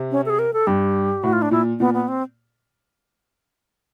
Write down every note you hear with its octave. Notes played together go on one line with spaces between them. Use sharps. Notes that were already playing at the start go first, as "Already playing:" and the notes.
Already playing: C3
C#4
A4
G#4
A#4
A4
G2 G4
A2 F#4
F4
D4
A#2 E4
A#2 B3
B3
C4